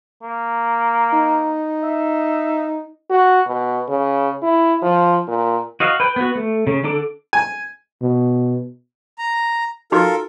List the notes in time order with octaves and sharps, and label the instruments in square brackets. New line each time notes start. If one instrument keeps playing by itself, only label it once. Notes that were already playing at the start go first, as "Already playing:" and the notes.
[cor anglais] A#3
[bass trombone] D#4
[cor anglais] E5
[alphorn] F#4
B2
C#3
E4
F3
A#2
[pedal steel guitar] F#4 D#5 F5
B4 G5
B3 F#4
A3
C#3
D3 D4 A4 D6
[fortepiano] G#5
[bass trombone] B2
[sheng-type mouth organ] A#5
[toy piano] D#4 F#4 [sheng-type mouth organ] F4 A4 A#4